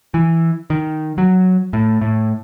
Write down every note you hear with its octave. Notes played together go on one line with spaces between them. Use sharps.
E3
D#3
F#3
A2
A2